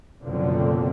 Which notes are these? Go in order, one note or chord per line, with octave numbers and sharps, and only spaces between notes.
F#1 B2 D3 F3 F#3 C4